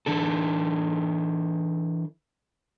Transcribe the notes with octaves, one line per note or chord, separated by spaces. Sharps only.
E3 D4 A4